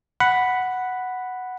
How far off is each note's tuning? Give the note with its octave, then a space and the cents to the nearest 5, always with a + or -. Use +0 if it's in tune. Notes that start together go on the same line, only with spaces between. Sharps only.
F#5 +0 B5 +0